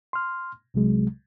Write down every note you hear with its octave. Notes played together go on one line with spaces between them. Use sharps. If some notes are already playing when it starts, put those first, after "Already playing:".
C6 F6
C2 C3 F#3 G#3